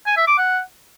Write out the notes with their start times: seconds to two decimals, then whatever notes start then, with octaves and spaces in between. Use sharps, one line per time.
0.06 G#5
0.17 E5
0.27 D6
0.38 F#5